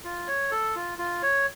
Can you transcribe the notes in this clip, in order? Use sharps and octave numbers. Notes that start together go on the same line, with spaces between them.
F4
C#5
A4
F4
F4
C#5